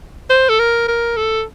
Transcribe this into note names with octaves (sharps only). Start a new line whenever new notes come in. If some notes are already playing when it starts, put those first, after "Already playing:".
C5
A4
A#4
A#4
A4